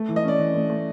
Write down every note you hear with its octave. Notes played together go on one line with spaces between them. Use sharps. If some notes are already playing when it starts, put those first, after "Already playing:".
Already playing: A3
E3
D#5
C#4 D5
E3
A3
A3